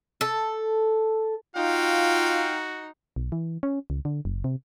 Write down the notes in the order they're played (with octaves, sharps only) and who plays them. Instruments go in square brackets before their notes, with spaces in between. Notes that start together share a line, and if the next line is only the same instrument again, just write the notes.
[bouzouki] A4
[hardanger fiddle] D#4 [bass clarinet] F4 [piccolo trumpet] F#4 [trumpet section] F5 G5
[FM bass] B1
E3
C#4
C#2
D3
F#1
C3